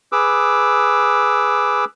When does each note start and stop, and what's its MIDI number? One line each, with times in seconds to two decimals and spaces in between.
0.12 1.85 68
0.12 1.85 71
0.12 1.85 86
0.12 1.85 88